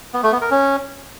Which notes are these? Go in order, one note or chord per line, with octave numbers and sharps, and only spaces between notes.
B3
A3
B3
A#4
C#4